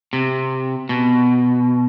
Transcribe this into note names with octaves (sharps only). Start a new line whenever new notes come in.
C3
B2